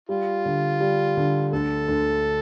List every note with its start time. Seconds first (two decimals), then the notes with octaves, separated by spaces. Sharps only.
0.09 G3 F4
0.45 D3
0.80 G3
1.17 D3
1.52 D2 A4
1.88 D2